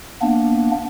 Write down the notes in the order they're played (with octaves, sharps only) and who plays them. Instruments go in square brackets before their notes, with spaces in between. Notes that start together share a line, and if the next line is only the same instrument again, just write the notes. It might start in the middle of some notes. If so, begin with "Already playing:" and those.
[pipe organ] A#3 B3 D4